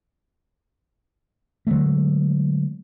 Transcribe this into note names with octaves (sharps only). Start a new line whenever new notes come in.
D3 F#3 G#3 A3